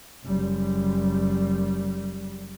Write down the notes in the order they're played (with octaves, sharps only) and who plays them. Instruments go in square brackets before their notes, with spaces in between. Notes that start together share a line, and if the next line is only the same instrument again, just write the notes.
[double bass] F#1 G3